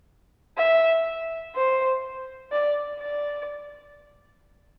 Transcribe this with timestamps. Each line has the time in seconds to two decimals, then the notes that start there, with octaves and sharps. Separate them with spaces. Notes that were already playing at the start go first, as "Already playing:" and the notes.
0.57 E5
1.55 C5
2.52 D5
3.00 D5